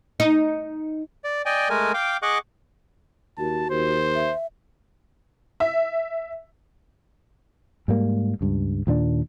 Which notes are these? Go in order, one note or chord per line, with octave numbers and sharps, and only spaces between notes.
D#4
D5
D5 D#5 G5 G#5
G#3 A3 A#4 G#5
F5 G5 D6
G#4 D#5 F#5 C#6 D6 F#6
D#2 F#4 A5
D#2 C5
E5
E5
G#2 G3 A#3
C#2 G2
D#2 A#2 C#4 D4